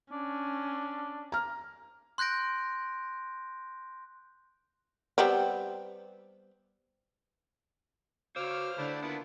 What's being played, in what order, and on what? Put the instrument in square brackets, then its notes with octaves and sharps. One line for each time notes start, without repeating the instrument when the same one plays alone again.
[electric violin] C#4 [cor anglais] D4
[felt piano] A#5 F6
[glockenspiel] C6 F#6 G6 A#6 D7
[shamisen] G3 B3 C4
[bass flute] F#4 [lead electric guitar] C5 C#5 [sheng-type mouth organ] F5 F6 [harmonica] D6 E6
[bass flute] D3 [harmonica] A3 D4 E4
[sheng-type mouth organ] A#3 F4 [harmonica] B3 D4 E4